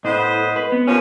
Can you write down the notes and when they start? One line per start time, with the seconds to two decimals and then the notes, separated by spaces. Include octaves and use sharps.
0.05 A2 B3 C5 D#5
0.56 B4
0.72 B3
0.87 D#2 F3 C#4